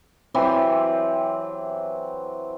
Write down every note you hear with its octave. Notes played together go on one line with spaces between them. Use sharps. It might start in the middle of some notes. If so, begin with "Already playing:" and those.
E3 F#3 C4 G4